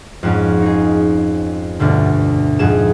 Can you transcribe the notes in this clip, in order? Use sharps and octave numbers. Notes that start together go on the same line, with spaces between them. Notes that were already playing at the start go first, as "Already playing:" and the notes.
F2 G#2 C#4
D#4 G#4
D2 G2 B2 D3
F2 G#2 G#4 E7